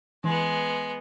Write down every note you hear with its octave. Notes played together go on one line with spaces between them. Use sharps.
E3 G#3 B3